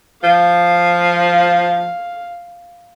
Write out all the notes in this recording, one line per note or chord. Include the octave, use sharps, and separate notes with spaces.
F3 F5